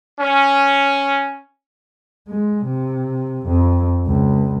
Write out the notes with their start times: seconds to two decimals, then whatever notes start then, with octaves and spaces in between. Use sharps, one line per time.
0.19 C#4
2.28 G#3
2.65 C3
3.47 F2
4.06 C#2